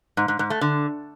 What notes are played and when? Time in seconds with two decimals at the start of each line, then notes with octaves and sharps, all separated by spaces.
0.17 G#2
0.28 G#2
0.39 G#2
0.50 A3
0.61 D3